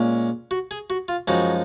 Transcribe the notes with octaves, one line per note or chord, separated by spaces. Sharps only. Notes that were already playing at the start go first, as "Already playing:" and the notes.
Already playing: A#2 G#3 C#4
F#4
G#4
F#4
F4
F#2 F3 G#3 D#4 F#4